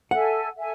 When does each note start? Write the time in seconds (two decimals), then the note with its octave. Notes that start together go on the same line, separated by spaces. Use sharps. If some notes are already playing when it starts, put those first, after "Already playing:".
0.11 A4 E5 F#5 G#5
0.56 A4 E5 G#5